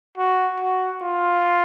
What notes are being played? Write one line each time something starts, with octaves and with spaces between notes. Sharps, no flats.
F#4
F#4
F4